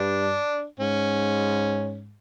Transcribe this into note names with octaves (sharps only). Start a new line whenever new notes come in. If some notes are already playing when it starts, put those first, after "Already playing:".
Already playing: G2 D4
G#2 C#4